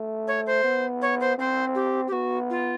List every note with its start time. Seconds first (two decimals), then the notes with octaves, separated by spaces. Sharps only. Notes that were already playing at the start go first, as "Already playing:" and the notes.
Already playing: A3
0.27 C#5
0.46 C5
0.64 B3
1.01 C#5
1.20 C5
1.38 C4 C5
1.75 G4
2.07 G4
2.12 B3 F#4
2.50 F4